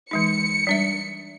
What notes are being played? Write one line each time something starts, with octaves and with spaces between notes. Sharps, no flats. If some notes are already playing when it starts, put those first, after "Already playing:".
E3 G#3 D#4 C#7
G3 D4 E5